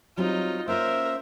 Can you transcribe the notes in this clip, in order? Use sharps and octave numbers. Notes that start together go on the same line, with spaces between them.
F#3 G3 C4 D#4 F4
A#3 C#4 F4 A#4 C5 E5